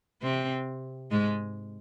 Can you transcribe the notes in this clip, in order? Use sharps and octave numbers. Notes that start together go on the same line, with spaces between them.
C3 C4
G#2 G#3